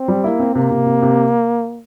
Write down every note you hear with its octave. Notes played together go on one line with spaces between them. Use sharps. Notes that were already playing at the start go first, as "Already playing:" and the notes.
Already playing: C4
G3
A#3 E4
C4
C3 A#3
C3
C3
C3